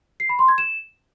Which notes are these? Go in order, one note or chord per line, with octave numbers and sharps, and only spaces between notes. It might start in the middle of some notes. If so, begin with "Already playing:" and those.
C7
B5
C6
G#6
E7